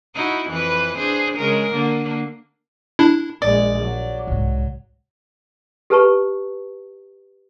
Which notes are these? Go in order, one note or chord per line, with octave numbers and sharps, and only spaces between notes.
D#4 E4 F#4
F2 E3 B4
D4 G#4 C5
C#3 G#3 A#4
D3 A#3
D4 E4
A#1 G#3 D5
F#3
C2 G#2
G4 A4 B4 A5 A#5 C#6